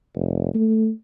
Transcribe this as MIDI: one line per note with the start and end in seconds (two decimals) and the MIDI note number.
0.15 0.50 29
0.55 0.89 57